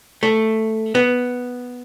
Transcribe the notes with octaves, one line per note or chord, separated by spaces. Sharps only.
A3
B3